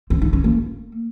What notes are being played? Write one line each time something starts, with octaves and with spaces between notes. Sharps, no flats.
C4
D#4
C#4
A#3